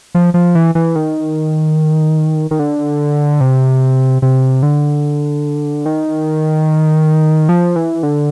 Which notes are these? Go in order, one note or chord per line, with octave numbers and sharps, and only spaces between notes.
F3
F3
E3
E3
D#3
D#3
D3
C3
C3
D3
D#3
F3
E3
D3